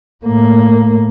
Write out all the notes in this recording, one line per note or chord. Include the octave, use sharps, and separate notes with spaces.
A2 A#3